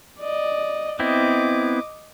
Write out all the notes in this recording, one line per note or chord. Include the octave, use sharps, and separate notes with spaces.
D5 D#5
B3 C4 E4 D#5 D6